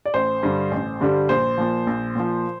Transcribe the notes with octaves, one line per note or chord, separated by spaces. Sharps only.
D5
A1 C5
G2 D3 G3
A1
G2 D3 G3
A#1 C5
A#2 F3
A#1
A#2 F3